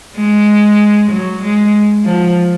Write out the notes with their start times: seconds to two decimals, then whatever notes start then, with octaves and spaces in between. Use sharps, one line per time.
0.16 G#3
1.11 F#3
1.42 G#3
2.05 F3